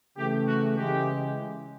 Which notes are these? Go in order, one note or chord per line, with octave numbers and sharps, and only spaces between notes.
C#3 E3 A3 G4
F#4
C#3 E3 G#3 G4